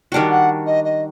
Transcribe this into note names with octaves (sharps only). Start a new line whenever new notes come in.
D#3 G3 D4 F#4 G5
F#5
D#5
D#5